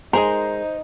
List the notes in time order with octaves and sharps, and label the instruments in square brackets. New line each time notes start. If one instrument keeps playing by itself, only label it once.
[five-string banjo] G#3 G#4 A#4 [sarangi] D#4 [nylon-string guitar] C5 [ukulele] A#5